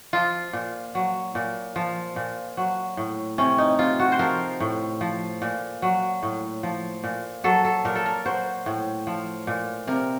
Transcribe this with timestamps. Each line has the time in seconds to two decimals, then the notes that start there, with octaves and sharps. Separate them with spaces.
0.13 F3 F4
0.53 A#2
0.95 F#3
1.35 A#2
1.76 F3
2.16 A#2
2.57 F#3
2.97 A2
3.38 C3 C#4
3.58 D#4
3.78 C3 F4
4.00 F#4
4.12 C5
4.19 F3 A#4
4.60 A2
5.01 F3
5.42 A#2
5.82 F#3
6.23 A2
6.63 F3
7.04 A#2
7.44 F#3 A4
7.65 A4
7.85 A#2 A#4
7.95 A4
8.06 A#4
8.25 F#3 C5
8.66 A2
9.07 F3
9.47 A#2
9.87 C3 A#4